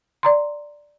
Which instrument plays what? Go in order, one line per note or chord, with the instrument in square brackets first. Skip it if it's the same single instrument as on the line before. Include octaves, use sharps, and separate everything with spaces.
[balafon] D5 A#5 C6